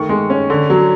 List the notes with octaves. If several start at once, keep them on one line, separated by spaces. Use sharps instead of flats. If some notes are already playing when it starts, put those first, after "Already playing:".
Already playing: D#3 A3 C#6
G#3
C#4
D3
F#3